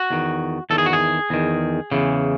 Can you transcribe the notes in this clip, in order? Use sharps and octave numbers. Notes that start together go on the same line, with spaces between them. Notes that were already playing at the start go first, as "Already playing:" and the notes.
Already playing: F#4
E2 D#3
E2 D#3 A4
G#4
F#4
G#4
E2 D#3
E2 C#3 E3